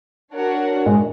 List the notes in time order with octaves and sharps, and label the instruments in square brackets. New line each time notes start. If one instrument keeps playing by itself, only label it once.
[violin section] D4 F#4 A#4 C#5 F#5
[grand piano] G#2 G#3